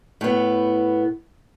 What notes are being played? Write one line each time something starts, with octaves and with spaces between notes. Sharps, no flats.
A2 B3